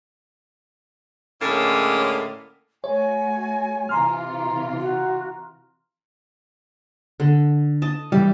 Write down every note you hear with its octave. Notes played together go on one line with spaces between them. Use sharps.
A2 D3 G#3 A#3 C#4
A3 F#4 C#5 G#5
C3 E3 F4 A#5 C6 F6
F#4
D3
D#5 A5
E3 G3 G4